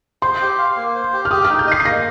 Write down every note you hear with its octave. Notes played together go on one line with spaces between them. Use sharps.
C5 C6
G4
F5
A#3
C5
G4
F6
G4 D#6
F6
D#4
G6
D#5 C7
C7
A#3 A#6